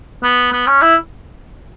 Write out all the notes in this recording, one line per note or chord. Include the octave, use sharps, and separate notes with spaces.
B3
B3
C#4
E4